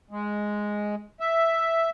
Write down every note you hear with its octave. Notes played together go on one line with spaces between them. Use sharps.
G#3
E5